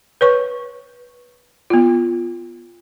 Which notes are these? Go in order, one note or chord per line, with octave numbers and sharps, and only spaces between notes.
B4 C#5 C#6
B3 F4